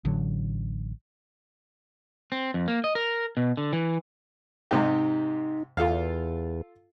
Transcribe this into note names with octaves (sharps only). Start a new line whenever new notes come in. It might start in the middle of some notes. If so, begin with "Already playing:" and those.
A1 D3 F#3
C4
F2
A#3
D#5
A#4
B2
D3
E3
G#2 C3 D#4 G4
E2 F4 A4 F5